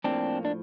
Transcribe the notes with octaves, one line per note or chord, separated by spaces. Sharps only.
A2 F3 A#3 C4 D4
D4